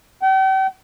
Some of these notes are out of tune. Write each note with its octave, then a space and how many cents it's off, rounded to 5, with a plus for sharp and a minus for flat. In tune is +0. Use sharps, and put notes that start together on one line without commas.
G5 -40